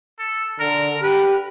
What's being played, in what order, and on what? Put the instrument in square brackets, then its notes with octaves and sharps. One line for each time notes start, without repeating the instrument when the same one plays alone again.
[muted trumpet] A4
[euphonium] D3 [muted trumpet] A#4
[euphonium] G4 [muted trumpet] B4